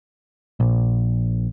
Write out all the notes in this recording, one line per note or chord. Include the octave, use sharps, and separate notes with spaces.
A#1